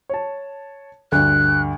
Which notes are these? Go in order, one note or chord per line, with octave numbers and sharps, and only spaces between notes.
C#5 A5
D2 G2 F#6